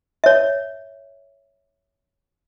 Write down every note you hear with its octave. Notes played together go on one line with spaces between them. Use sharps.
C#5 E5